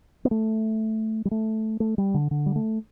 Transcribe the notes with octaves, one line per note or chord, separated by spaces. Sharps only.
B3
A3
G3
A3
A3
G3
D3
D3
G3
A3